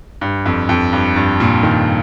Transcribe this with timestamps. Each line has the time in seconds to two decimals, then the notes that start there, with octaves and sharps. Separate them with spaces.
0.21 G2
0.46 F2
0.69 F2
0.93 G2
1.16 G2
1.40 A#2
1.63 D#3